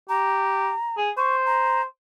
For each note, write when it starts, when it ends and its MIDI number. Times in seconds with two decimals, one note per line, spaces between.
0.09 0.70 67
0.09 0.96 82
0.97 1.10 68
1.17 1.83 72
1.17 1.36 85
1.46 1.81 82